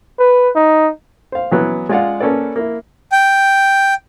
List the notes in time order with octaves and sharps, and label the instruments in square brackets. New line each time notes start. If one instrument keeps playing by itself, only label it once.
[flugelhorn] B4
D#4
[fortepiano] C5 F5
E3 F#3 B3
G#3 F4 D5 F5 F#5
A#3 C#4 A4 B4 D5
A#3 E4
[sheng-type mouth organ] G5